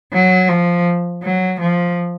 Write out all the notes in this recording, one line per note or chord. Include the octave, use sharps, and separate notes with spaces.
F#3
F3
F#3
F3